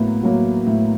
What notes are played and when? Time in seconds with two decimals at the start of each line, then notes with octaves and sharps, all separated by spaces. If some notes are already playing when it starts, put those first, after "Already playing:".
Already playing: A2 F#3 A#3 B3
0.23 F#3 A#3
0.67 A2